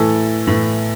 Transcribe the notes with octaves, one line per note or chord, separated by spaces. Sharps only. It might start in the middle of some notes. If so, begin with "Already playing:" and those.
Already playing: A2 E3 A4
A2 E3